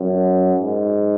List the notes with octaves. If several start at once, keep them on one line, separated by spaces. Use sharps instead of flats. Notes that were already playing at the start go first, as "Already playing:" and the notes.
Already playing: F#2
G#2